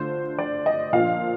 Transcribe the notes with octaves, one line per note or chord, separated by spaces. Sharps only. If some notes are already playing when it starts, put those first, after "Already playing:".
Already playing: D3 A3 D4 F4 C5
D5
D#5
A#2 F3 A#3 D4 F4 F5